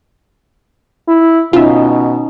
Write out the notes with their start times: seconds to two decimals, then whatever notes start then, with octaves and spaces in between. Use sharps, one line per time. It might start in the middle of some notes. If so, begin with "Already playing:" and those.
1.08 E4
1.53 B2 C#4 D#4 F4 E5